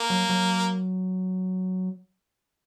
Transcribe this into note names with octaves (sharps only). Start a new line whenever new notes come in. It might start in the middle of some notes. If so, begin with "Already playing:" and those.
Already playing: A#3
F#3
F#3